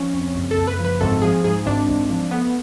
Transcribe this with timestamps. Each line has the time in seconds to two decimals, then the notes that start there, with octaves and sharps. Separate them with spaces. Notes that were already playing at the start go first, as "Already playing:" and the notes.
Already playing: F3 C#4
0.13 F2
0.34 F#1
0.51 A4
0.57 F#1
0.67 B4
0.79 F3
0.85 B4
1.01 G#1 A4
1.22 F3 G#4
1.44 G#2 G#4
1.66 G#1 D4
1.88 G#1
2.10 F3
2.31 A3 B3